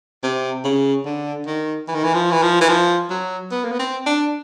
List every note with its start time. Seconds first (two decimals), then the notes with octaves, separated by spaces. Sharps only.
0.23 C3
0.64 C#3
1.05 D3
1.47 D#3
1.88 E3
1.95 D#3
2.04 E3
2.15 F3
2.32 E3
2.43 F3
2.61 E3
2.69 F3
3.10 F#3
3.51 B3
3.64 A#3
3.72 B3
3.79 C4
4.06 D4